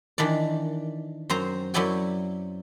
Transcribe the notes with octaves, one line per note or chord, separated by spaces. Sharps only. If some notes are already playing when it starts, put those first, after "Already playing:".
D#3 E3 D4 D5
F#2 C4 C5 A#5
F#2 F#3 E4 D5 G5 G#5